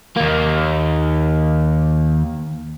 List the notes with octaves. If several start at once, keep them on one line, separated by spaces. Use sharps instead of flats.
D#2 A#3